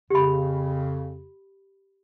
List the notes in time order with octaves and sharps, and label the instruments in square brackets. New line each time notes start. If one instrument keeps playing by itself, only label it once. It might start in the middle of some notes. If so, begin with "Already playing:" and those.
[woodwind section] F2 C#3 [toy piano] G4 B5